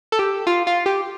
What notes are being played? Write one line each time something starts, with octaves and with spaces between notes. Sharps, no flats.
A4
G4
F4
F4
G4